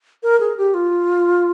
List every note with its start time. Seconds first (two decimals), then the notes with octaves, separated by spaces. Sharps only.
0.23 A#4
0.40 G#4
0.57 G4
0.74 F4